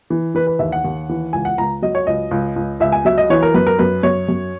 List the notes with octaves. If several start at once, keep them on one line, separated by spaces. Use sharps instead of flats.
E3
E3 B4
B4
D#2 E5
F#5
D#2
E3
C#2 G#5
F#5
C#2 A#5
F#3 D#5
C#5
C#2 D#5
C#2
C#2
C#2 E5
G#5
F#3 E5
D#5
E3 C#5
A#4
F#2 B4
A#4
F#2 B4
F#2 C#5
F#2